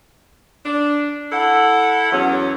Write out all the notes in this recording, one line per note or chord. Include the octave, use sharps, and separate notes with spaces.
D4
E4 A4 F#5
E2 F#3 C#4